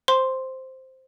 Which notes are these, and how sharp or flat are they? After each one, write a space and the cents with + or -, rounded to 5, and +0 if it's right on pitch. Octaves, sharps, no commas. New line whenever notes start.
C5 +0 C6 +0